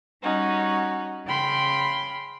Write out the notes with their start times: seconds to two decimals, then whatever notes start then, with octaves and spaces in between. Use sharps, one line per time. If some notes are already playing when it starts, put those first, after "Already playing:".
0.23 G3 C#4 D#4 F#4
1.25 C#3 G5 B5 C6 F6